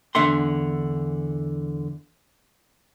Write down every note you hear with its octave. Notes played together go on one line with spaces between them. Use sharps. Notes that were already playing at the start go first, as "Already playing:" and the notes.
E2 D3 E5 F#5 C6